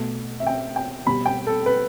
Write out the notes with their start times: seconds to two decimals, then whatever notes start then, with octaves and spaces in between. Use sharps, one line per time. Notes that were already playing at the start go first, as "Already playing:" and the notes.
Already playing: B2 A3
0.40 E5
0.47 G5
0.76 G5
1.06 B2 G3 B5
1.26 G5
1.47 A4
1.66 B4